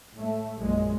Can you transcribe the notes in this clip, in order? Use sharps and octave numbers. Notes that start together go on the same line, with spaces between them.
A2 A3
A#1 F#2 A#2 G#3